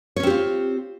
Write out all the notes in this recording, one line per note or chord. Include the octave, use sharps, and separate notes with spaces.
C4 C#4 F4 G4 C#5